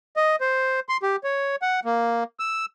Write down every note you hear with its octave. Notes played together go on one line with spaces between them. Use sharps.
D#5
C5
C6
G4
C#5
F#5
A#3
E6